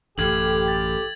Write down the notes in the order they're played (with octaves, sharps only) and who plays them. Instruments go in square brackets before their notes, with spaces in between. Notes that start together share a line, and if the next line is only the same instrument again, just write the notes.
[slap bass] A1 F#2 [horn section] G4 [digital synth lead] A4 [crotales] G#6 F#7
[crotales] A6